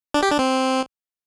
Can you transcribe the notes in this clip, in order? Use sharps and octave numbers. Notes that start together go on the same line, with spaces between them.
D4
G4
D4
C4